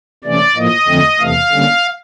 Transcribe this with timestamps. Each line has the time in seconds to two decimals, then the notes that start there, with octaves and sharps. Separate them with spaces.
0.24 C3 E3 A3 C#4 D5
0.56 A2 F3 A#3 D#5
0.88 F2 D3 F3 A3 C4
1.20 E2 C3 E3 A3 F5
1.51 D3 G3 A#3 C#4